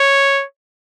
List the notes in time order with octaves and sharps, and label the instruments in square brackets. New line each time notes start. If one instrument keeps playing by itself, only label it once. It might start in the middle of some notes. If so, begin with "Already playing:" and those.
Already playing: [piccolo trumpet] C#5